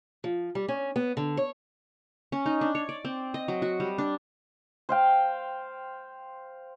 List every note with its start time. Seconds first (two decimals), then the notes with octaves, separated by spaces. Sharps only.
0.24 F3
0.55 G3
0.68 C#4
0.96 B3
1.17 D3
1.37 C#5
2.32 C#4
2.46 D#4
2.61 D4
2.75 C#5
2.89 D5
3.05 C4
3.34 D#5
3.48 F#3
3.62 F#4
3.80 G3
3.98 D4
4.89 C5 F5 G5